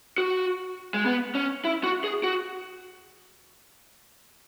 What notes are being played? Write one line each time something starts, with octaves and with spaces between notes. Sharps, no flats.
F#4
G#3
B3
C#4
E4
F#4
G#4
F#4